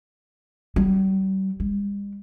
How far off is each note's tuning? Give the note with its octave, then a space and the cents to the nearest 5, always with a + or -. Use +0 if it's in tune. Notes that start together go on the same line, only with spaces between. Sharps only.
G3 -40
G3 +45